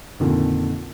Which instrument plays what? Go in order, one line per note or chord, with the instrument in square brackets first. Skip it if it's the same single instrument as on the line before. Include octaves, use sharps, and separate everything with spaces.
[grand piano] F2 A#2 D3 D#3